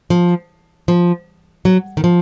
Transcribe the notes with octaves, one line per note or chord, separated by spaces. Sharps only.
F3
F3
F#3
D#3
F3